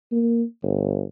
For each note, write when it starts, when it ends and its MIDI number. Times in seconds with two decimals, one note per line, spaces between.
0.12 0.43 58
0.62 1.02 31